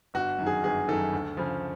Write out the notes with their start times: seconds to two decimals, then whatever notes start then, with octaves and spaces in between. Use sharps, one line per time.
0.14 G1 F#4
0.38 F#2 D#3
0.46 G#4
0.63 G1 G#4
0.88 F#2 D#3 A4
1.13 D2
1.37 C#3 F3